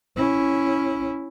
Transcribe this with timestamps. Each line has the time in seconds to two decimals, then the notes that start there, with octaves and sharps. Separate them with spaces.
0.17 C#4 E4